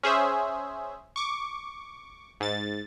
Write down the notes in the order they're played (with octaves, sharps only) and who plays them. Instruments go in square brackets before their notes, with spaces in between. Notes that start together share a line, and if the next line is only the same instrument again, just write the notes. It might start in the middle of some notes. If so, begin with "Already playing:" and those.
[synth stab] C#4 G#4 C5 E5
C#6 D6
G#2 A6